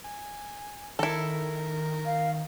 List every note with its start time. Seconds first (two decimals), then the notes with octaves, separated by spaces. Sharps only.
0.04 G#5
0.99 D#3 E4 A4 A#4
2.06 F5